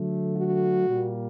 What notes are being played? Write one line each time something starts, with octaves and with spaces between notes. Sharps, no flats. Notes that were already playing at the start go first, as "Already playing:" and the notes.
Already playing: D3 F#3 A3
F#4
A#2 G3 A#3